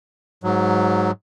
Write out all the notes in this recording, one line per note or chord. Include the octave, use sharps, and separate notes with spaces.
G#2 F#3